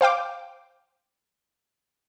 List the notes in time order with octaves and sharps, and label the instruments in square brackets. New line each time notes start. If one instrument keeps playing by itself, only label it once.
[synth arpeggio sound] C5 F5 G5 D6